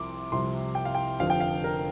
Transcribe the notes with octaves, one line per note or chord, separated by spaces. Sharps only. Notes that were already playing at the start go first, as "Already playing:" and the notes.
Already playing: C2 C3 F3 C6 D6
C2 C3 F3 C6
G5
F5
G5
F1 F2 D3 F3 F5
G5
F5
A#4